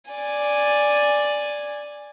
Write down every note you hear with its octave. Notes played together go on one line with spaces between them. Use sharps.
D5 G#5